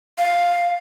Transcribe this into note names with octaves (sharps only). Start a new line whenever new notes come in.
F5